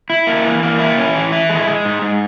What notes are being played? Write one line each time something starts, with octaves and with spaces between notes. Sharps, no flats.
E4
A#3
E3
A#3
E4
C#4
E3
E4
G#3
G#3
G#2
G#2